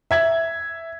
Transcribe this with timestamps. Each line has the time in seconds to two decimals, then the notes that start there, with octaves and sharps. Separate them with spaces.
0.11 E5 G#6